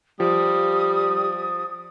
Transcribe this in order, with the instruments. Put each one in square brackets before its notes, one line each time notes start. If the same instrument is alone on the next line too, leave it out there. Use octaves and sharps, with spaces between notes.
[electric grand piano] F3 [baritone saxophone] G3 [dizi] D#6